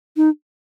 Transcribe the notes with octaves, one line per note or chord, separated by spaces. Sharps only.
D#4